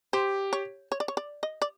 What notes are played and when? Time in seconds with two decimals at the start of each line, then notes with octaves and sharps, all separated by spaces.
0.13 G4 C5
0.53 C#5
0.92 C#5
1.00 D5
1.08 C#5
1.17 D5
1.43 D#5
1.62 D5